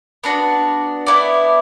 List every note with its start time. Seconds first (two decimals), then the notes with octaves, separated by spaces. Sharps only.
0.24 B3 D4 F#4
1.06 B3 E4 D5